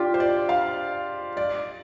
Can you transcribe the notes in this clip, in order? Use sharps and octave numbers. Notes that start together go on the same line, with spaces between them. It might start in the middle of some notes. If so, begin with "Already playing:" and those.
Already playing: D4 F4 G4
C5
D5
F5
D5